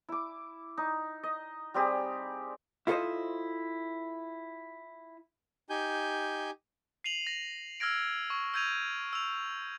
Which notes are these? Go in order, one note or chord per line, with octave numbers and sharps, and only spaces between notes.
E4 D6
D#4
D#5
G3 C4 G4 G#4
E4 F4 A4 B4 C5 D#5
D#4 G4 G#5 G6
C7 D#7 F7 F#7
A#6
E6 F6 G#6 A#6 D7
C#6
E6 G6 G#6 D#7 F7
E6 F7